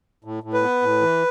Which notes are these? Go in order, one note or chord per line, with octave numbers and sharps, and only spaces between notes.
A2
A2
B4
B3
A2
E3